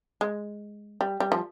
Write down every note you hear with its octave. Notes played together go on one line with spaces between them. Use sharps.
G#3
G3
G3
F3